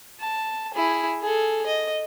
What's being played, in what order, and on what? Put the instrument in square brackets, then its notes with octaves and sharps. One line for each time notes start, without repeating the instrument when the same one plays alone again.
[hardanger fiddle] A5
E4 G#4
G#4 A4
D#5